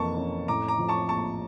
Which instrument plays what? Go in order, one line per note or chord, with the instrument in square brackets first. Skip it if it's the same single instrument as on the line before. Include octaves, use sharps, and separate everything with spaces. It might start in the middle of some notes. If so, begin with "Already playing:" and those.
Already playing: [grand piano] F2 E3 A#3 [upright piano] A5 C#6
[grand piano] C#4
[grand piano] A2 [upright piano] A#5 D6
[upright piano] A#5 D6
[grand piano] F3
[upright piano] A5 C#6
[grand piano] A#1 [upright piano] A5 C#6